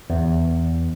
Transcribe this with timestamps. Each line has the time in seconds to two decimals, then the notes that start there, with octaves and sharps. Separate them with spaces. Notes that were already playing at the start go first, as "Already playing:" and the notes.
0.10 E2